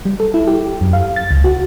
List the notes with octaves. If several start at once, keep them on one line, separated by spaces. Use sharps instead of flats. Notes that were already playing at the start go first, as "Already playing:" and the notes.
G3
A4
E4
G4
F#2
F5
A6
C#2
F#4